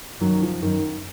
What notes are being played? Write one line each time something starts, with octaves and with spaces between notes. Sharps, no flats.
F#2 D#3 F#3
F3
F#2 D#3